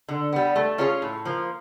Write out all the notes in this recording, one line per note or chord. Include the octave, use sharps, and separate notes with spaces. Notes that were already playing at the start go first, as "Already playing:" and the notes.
D3
G3 B3
A3
C#4 F4 G#4 C#5
A2
F3 A#3